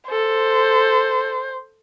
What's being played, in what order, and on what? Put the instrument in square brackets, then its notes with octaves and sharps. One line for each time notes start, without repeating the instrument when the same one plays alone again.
[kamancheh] A4 [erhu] C5